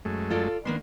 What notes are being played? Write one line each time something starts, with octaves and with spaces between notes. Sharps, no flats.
F#2 G#3 A3
F4 A4 D5
D#3 A#3 B3 D4 C6